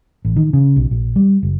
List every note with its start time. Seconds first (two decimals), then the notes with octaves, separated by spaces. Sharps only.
0.25 A1
0.36 D#3
0.53 C#3
0.76 B1
0.91 A#1
1.16 G3
1.43 F#1